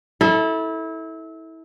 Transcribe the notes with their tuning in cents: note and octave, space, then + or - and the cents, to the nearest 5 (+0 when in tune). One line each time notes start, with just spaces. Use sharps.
E4 -25 A4 +0